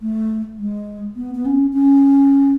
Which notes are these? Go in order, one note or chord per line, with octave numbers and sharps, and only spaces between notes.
A3
G#3
B3
B3
C#4
C#4